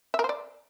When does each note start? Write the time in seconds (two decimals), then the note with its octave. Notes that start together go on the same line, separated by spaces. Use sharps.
0.14 E5
0.19 A#4
0.24 C5
0.29 D5